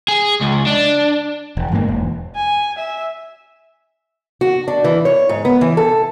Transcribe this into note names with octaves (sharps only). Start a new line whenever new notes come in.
G#4
C#2
D4
E1
G1 G#2 C3 A#3
E1
G#5
E5
F#4
D4
E3
C#5
G#2
B3
E3
A4